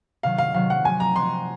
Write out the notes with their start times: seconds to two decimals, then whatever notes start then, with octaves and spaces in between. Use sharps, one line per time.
0.23 C3 D#3 F#3 F5
0.38 F5
0.54 C3 D#3 F#3 F5
0.70 F#5
0.83 C3 F3 C4 F#4 G#5
1.00 A#5
1.15 C3 F3 C4 F#4 C6